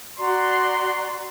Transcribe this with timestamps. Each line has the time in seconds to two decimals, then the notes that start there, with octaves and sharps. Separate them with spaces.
0.18 F#4 D5 A#5 C6